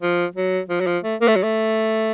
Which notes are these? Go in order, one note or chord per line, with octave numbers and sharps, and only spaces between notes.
F3
F#3
F3
F#3
F3
A3
A#3
A3
F#3
A3